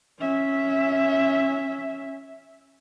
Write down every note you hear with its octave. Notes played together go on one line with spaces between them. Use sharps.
C#4 E5